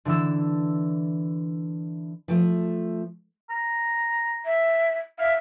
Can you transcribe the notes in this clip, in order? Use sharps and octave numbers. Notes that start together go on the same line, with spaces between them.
D3 E3 D4 E4 E6
F3 A3
A#5
E5
E5 F5